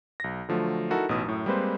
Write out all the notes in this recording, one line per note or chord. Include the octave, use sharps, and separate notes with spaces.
B1 A#6
D3 F3 F#3 A3
D#4 E4 F#4 A4 A#4
A1 B2 D#4 D#6
F#2 A2
G3 G#3 A#3 C4 B4 C5